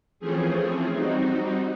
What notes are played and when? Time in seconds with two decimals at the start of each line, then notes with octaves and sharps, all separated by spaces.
0.19 E3 F3 A3 C4 C#4 G#4
0.93 G3 C4 D#4 F#4